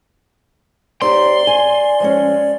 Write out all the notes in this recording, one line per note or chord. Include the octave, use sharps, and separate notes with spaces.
C4 D#4 G4 D5 C6
G#5
F3 G#3 C#4